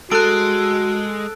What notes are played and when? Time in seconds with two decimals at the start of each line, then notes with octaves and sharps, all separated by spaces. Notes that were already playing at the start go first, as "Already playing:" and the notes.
0.11 G#3 F#4 A4 F#6 D7